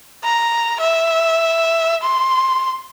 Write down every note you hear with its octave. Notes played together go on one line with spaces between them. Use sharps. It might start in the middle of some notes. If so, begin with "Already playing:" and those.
A#5
E5
C6